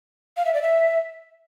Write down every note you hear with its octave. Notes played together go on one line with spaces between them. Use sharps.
F5
E5
D5
E5